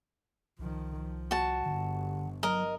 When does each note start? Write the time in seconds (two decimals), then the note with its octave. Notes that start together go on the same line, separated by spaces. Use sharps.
0.59 C2 D#3 F3
1.00 F3
1.31 F#4 A5
1.66 G1 G2 D3
2.43 F#3 A#4 D#5